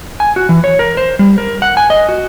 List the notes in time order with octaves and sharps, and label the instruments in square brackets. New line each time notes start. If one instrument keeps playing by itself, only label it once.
[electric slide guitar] G#5
F#4
E3
C#5
A#4
C5
G3
A#4
F#5
G#5
D#5
F#4